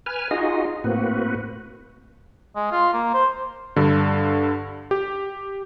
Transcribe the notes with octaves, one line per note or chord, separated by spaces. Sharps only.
B4 G#5 F6
D#4 F4 F#4 G#4 D#5
A2 A#3 C4 F#4 B4
G#3
F4
A#3
C5
G2 D3
G4